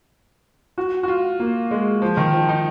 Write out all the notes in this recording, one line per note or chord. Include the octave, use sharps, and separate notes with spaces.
F#4
F#4
F4
A#3
G#3
F3
D#3
F3
D#4